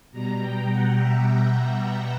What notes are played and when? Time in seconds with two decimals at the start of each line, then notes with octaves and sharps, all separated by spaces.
0.12 B2 G3 A#5
0.40 G5
0.69 F#5
0.97 E5